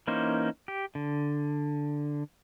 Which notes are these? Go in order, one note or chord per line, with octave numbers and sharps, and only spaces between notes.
E3 A#3 C#4 D#4 C5
G4
D3